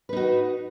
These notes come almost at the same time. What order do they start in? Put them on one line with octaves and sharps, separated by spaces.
B4 D#4 F#4